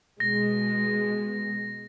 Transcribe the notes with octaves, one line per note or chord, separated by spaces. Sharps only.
B2 G#3 A#6